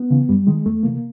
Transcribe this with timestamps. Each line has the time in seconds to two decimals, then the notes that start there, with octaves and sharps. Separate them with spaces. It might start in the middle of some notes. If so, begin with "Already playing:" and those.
Already playing: B3
0.11 C#3 E3
0.29 F#2 G3
0.47 D#3 G#3
0.66 E2 A3
0.83 C3 E3 A#3